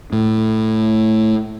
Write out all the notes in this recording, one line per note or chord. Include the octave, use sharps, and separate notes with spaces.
A2